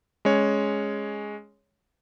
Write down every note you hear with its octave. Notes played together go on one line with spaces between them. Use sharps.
G#3 C#4 C#5